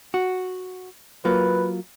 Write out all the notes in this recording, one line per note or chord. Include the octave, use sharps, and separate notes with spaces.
F#4
F#3 A#3 F4 B4